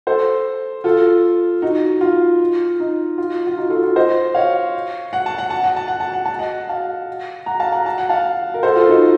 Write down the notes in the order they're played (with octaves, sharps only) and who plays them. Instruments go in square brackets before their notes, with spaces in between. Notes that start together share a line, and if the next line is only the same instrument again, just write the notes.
[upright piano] A4 C5
F4 A4
D#4 F#4
F4
D#4
F4
F4
D#4 F#4
F4 A4
F4
C5 D#5
C#5 F5
F#5
A5
F#5
A5
F#5
A5
F#5
A5
F#5
A5
D#5 F#5
F5 A5
F#5 A#5
F5 A5
F#5 A#5
A5
F#5
F5 A5
A#4
A4 C5
F4 A4
D#4 F#4